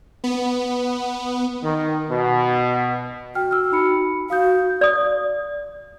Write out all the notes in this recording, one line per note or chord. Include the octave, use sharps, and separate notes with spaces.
B3
D#3
B2
F#4 G5 F6
E6 F6
D#4 B5 C#7
F#4 F5 D#6 G6
D5 D#6